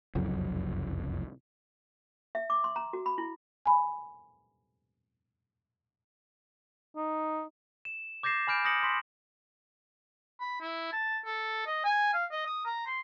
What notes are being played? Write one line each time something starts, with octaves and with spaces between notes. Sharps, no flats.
F#1 C2 F2 F#3
E5
D6
C6
A#5
F#4
B5
E4
G#5 B5
D#4
E7
D6 G6 A6 A#6 C7 E7
G#5 B5 F6 G6 D7
D#6 G6 A#6 C#7 F#7
C6 B6
B5
E4
A5
A4
D#5
G#5
F5
D#5
D#6
A#5
C6